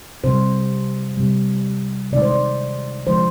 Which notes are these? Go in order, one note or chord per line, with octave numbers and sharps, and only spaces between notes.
C3 G3 C5
C3 G3
C3 D#3 G#3 D5
C5
D5
D3 F3 G#3 C5